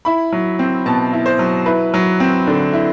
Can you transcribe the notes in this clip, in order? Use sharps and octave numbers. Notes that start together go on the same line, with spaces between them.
E4 B5
F#3
C4
B2 A5
E4
C5
F#3
E4 B4
F#3
C4
D3
E4